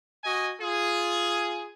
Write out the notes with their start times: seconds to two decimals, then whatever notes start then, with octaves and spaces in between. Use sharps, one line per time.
0.23 F#4 D#5 G#5
0.60 F4 G#4